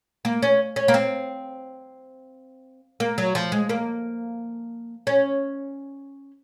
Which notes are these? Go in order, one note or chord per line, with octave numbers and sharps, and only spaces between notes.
A#3
C#4
C#4
A#3
C4
A#3
F#3
F3
G#3
A#3
C#4